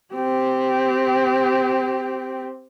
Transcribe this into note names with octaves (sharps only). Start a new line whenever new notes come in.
C4 G4